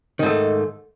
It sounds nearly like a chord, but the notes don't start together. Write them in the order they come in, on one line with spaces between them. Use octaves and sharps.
D#3 G#2 A3